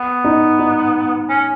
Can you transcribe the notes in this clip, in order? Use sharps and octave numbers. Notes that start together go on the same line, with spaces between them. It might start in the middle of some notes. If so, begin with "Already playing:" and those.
Already playing: B3
D#4
D#4
C#4